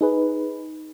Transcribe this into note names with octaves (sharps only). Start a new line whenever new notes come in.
D#4 G#4 B4